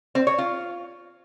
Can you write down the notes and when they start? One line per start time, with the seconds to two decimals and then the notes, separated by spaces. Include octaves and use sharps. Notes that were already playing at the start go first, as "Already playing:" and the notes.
0.15 C4
0.27 C#5
0.38 F4